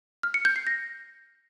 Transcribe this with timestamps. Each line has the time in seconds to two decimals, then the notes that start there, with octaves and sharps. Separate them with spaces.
0.23 F6
0.34 C#7
0.45 G6
0.56 C7
0.67 A#6